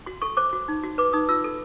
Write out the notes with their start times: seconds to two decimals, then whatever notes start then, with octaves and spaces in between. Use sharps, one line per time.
0.06 F#4 C6
0.22 A4 C#6
0.37 C5 D6
0.53 F#4
0.68 D#4
0.84 F#4
0.98 B4 D6
1.13 D#4 D#6
1.29 F4 E6
1.44 A4